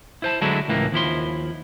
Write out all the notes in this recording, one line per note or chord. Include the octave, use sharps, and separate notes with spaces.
E4 C5 A5
D3 F#3 G#3 A3 D4 E4
C#2 A2 E3 A#3
D#2 F3 E4 C6